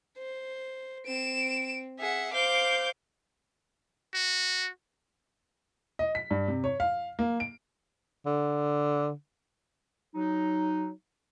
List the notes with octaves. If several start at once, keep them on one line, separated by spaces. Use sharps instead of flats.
C5
C4 D7 E7
G#4 E5 F#5
C5 F5 D6 G6
F#4
D#5
B6
G2
C3
C#5
F5
A#3
D7
D3
F#3 D#4